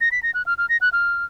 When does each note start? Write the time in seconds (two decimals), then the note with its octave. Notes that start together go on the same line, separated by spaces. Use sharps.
0.01 A#6
0.11 B6
0.23 A#6
0.34 F#6
0.46 F6
0.58 F6
0.69 A#6
0.81 F#6
0.92 F6